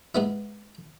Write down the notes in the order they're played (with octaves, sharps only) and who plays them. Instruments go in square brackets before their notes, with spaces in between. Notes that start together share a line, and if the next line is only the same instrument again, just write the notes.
[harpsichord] G#3 B3 E4